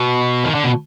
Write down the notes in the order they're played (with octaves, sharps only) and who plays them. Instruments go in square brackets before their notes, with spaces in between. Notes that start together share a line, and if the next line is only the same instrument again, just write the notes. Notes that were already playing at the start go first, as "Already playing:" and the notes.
Already playing: [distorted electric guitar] B2
D#3
D3
B2